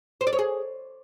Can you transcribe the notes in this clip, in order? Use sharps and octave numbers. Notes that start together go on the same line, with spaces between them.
C5
D5
C#5
G#4